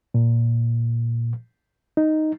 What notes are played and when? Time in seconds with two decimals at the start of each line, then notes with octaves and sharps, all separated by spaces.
0.14 A#2
1.97 D#4